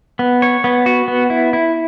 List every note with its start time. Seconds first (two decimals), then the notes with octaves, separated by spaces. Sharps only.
0.19 B3
0.42 C#5
0.64 B3
0.86 F#4
1.08 B3
1.30 E4
1.53 E4